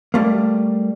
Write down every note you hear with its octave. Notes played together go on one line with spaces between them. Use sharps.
G3 A3 A#3